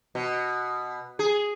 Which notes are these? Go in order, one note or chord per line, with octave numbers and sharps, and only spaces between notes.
B2
G#4